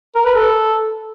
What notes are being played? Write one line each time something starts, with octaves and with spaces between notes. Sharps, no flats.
A#4
B4
A4